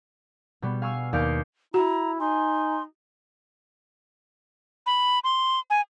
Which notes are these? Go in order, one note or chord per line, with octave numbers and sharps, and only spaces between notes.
B2 G3 B3
F5 G#5 C#6 E6 F6
D#2 D5 F5 G6 C#7 D7
E4 F#4 A#5
D#4 G#5 C6
B5
C6
G#5